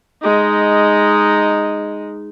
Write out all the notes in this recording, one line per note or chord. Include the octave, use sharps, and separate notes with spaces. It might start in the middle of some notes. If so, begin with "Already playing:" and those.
G#3 D#4